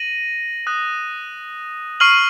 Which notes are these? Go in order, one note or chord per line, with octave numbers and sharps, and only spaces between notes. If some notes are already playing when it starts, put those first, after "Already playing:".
Already playing: A#6 D#7 F#7
D#6 F#6 A#6
C#6 F6 C7 D#7 F#7